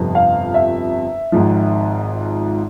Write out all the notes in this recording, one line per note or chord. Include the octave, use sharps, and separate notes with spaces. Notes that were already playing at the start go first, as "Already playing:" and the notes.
Already playing: G1 F2 C3 F3
F5
E5
G#1 G#2 F3